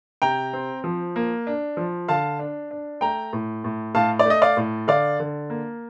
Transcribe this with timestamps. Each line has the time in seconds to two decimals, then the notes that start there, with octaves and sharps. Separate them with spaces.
0.22 C3 G5 A#5
0.53 C4
0.84 F3
1.16 A#3
1.47 D4
1.77 F3
2.08 D3 F5 A5
2.39 D4
2.71 D4
3.01 A3 G5 A#5
3.33 A2
3.64 A2
3.95 A2 F5 A5
4.19 D5
4.26 A3 D#5
4.42 D5 F5
4.57 A2
4.87 D3 D5 F5
5.20 D3
5.50 A#3